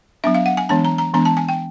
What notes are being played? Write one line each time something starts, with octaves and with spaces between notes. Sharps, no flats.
F#3 B3 D4 E5
F5
F#5
G#5
E3 G#3 B3 D4 A5
A#5
A#5
E3 G#3 B3 D4 A#5
A5
G#5
G5